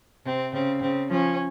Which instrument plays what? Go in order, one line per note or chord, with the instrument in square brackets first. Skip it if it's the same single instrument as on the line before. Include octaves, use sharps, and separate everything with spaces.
[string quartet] C3 [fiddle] C4
[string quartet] C#3 [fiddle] C4
[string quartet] C#3 [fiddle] C4
[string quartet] F3 [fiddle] C#4